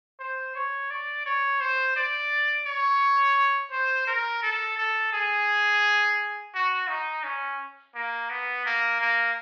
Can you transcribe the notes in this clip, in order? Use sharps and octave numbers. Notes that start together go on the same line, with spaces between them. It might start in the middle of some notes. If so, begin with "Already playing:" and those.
C5
C#5
D5
C#5
C5
D5
C#5
C5
A#4
A4
A4
G#4
F#4
D#4
C#4
A#3
B3
A#3
A#3